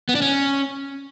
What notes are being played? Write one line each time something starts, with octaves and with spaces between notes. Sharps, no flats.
B3
D4
C#4